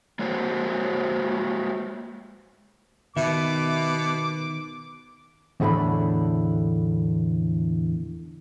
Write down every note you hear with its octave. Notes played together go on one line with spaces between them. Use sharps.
G#3 A#3 F#4 C5 C#5
B2 D#3 E5 D6
E2 A2 D3 A3 B5